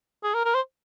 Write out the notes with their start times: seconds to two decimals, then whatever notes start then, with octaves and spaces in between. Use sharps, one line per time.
0.24 G#4
0.34 A#4
0.45 A#4
0.54 C5